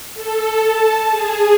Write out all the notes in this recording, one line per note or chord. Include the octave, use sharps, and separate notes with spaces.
A4
A5
G#4